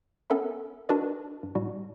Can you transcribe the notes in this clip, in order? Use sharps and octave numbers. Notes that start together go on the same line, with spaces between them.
B3 C#4 A4 A#4 E5 B5
D4 F#4 A#4 B4 D5 D#5
G2
A2 G3 F#4